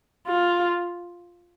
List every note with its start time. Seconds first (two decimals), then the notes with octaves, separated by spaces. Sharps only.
0.28 F4